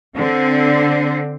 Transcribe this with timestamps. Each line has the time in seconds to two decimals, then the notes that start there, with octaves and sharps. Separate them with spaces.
0.16 D3 C4